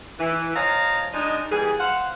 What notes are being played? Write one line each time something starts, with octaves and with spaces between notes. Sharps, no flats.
E3
F3 C#5 D#5 F5 A#5
G#3 D4 D#4
E3 G3 A#3 G#4
C5 F5 F#5